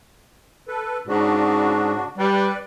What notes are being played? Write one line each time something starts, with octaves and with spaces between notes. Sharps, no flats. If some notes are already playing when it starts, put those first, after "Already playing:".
A4 B4
G#2 C#3 D4 F#4
G3 B4 D5